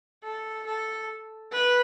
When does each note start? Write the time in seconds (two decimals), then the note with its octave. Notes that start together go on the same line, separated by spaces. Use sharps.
0.23 A4
0.66 A4
1.52 B4